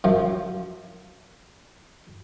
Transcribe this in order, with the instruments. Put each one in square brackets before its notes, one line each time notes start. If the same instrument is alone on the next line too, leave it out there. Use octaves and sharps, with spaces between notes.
[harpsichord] F#2 F3